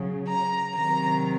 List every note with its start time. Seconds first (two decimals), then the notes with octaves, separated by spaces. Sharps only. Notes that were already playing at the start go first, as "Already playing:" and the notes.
Already playing: C#3 F#3
0.29 A#5
0.76 C3 D#3 F#3 A#5